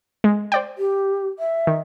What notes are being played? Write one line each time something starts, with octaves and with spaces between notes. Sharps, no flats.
G#3
C5 D5 G5
G4
E5
D#3